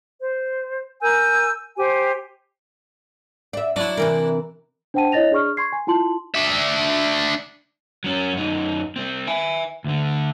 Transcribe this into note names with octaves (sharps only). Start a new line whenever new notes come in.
C5
A#4 G#5 E6 G6
G4 C5 G#5
D5 E5
F#3 D4 E4
C3 E3 A#4
D4 C5 F#5 G5 A5 D#7
E4 C#5 D#5 A6 A#6 F7
D4 G#4 D5 C#6 F6
C6 C#6 G#6 C7
G#5
E4 F4 A5 C6 F#7
D4 E5
F#3 C#4
F#2 D#4
G3 C4
E5 G#5
D2 D3